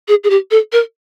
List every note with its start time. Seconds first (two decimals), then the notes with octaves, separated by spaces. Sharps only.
0.08 G#4
0.24 G#4
0.30 G4
0.51 A4
0.72 A#4